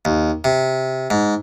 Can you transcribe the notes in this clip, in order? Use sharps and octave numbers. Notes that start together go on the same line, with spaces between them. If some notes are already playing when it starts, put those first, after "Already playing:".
D#2
C3
G#2